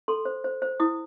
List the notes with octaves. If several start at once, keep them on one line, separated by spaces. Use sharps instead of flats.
A4 C6
C5
C5
C5
E4 D#6